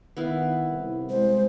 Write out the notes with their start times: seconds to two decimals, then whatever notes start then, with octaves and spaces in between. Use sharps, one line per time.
0.17 D#3 B3 E4 F5
0.70 C2
1.09 G#3 C5